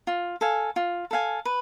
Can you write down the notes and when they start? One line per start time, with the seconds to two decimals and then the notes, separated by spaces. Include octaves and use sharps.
0.07 F4
0.41 A4 F5 G#5
0.76 F4
1.11 A4 F5 G#5
1.45 B4